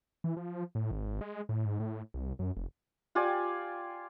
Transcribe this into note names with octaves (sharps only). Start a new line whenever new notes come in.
E3
F3
A2
G#1
G#3
A2
G#2
A2
C2
F#2
F1
F4 G4 D5 G#5